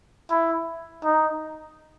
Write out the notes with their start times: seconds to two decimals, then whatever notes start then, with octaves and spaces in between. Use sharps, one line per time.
0.30 E4
1.04 D#4